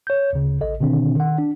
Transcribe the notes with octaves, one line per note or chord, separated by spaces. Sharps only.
C#5 G6
D2 C#3
A1 A4 D#5
B2 D3 D#3 C4 D4
D#3 F#5
D4